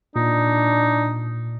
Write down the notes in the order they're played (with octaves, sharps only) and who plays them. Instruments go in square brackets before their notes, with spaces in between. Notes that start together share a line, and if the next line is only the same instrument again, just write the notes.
[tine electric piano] A#2 [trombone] D4 [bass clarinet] D#4